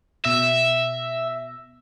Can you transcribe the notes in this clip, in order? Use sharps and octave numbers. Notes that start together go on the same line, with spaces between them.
B2 E5 E6 A#6